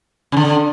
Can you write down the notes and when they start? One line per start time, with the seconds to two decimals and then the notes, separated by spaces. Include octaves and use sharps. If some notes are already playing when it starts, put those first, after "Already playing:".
0.32 C#3
0.37 D3